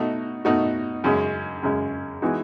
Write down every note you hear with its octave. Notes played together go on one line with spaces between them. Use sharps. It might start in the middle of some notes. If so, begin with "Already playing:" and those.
Already playing: B2 A3 D#4 F#4
B2 A3 D#4 F#4
F#2 C#3 G#3
F#2 C#3 G#3
E3 G#3 B3 D#4 F#4